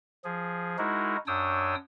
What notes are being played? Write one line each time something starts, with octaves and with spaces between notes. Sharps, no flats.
F3 G#4
G#3 D#4 E4 F#4 A#4
F#2 D4 C#5 G5 D#6 E6